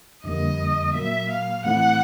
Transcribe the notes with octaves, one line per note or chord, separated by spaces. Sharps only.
F2 D3 G3 A#3 D#5
A#2 F#3 A#3 E5
F5
A2 E3 A3 C4 E4 F#5